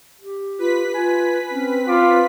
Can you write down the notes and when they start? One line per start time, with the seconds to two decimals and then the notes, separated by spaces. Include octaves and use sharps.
0.21 G4
0.59 F4 B4 B6
0.94 F4 G#5
1.51 C4 C#4
1.88 F4 D6